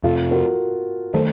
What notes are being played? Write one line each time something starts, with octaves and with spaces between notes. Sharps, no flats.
F2 C3 F3 F4 A4
F#4 A#4
D#3 F#3 A3 A4 C5